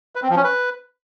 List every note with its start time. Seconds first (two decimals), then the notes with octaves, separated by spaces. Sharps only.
0.15 B4
0.23 C4
0.30 F3
0.37 C#4
0.44 B4